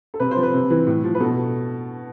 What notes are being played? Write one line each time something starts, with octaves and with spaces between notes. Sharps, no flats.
A4
C3 B4
C5
F3
B4
C3
E3
A2
F3
B4
B2 A4